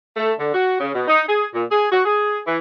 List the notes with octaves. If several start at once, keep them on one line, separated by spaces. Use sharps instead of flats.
A3
D3
F#4
C#3
B2
D#4
G#4
A#2
G#4
F#4
G#4
E3